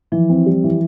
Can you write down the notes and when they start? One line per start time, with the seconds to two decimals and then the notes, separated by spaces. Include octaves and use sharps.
0.12 E3 F3
0.30 C4
0.46 G3
0.64 E3